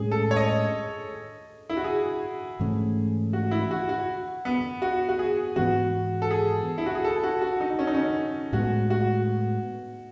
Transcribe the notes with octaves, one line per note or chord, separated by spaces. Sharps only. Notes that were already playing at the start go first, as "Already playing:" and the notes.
Already playing: A2 G#3 C#4 G#4
A4
C#5
D#5
E4
F#4
G#4
G#2 E3 A3 C#4
F#4
E4
F#4
F#4
B3
F#4
F#4
G#4
G#2 E3 B3 F#4
A4
G#4
E4
F#4
G#4
A4
F#4
F#4
D#4
C#4
D#4
C#4
A2 G#3 B3 F#4
F#4